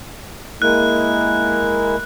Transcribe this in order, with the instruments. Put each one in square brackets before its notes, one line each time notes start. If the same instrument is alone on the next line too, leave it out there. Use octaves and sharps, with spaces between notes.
[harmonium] G#3 A#3 E4 [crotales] F#6